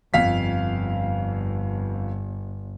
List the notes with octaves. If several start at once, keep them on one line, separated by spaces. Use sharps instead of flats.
G1 F2 F5 B6